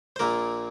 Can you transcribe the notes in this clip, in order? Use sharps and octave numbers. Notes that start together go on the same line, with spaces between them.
C5
A#1 A#2 A#3 A#4